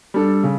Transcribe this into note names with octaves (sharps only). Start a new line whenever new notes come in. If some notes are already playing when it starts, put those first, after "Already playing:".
G3 D4 A4
C#3